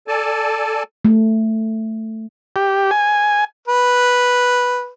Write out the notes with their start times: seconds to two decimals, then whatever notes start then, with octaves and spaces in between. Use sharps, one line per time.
0.08 A4 D5 G#5 A5
1.05 A3
2.56 G4
2.91 G#5
3.68 B4